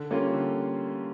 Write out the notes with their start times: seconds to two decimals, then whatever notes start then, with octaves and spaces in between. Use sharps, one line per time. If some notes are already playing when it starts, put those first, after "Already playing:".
Already playing: D3
0.11 G3 A#3 C#4 F4
0.33 D3